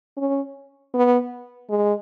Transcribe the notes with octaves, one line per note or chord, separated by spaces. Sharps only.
C#4
B3
G#3